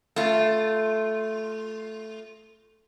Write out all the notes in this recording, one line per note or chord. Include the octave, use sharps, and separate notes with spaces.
A3 F4